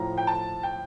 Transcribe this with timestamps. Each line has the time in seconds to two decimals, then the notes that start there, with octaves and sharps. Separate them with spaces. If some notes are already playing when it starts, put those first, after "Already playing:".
Already playing: A2 F3 A#5
0.18 G5
0.27 A5
0.63 G5